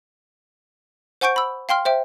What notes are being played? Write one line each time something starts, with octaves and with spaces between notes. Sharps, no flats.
C5 F#5 G#5 C#6 G6 D7
B5 E6
F5 G5 C6 F6
C5 E5 G5